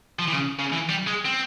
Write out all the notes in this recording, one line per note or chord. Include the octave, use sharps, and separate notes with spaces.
F3
E3
C#3
C#3
E3
G3
G#3
C4